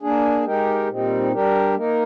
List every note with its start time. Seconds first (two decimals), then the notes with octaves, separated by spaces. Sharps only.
0.02 A#3 D4 G#4
0.45 G#3 D#4 G4 A#4
0.88 A#2 G3 C4 D#4
1.33 G3 D4 G4 A#4
1.76 A#3 D#4 A#4